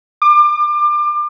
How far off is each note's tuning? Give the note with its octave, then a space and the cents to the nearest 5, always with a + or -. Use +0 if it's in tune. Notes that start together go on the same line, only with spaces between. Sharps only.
D6 +25